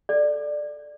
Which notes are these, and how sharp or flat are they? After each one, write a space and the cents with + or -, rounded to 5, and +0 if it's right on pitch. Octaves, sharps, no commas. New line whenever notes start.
A4 +0 D5 +10